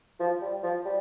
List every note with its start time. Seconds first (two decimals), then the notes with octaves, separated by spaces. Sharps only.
0.19 F3
0.41 G3
0.63 F3
0.85 G3